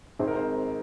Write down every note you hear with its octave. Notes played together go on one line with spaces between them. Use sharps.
G#1 G#2 G#3 C4 C5
A#4
C5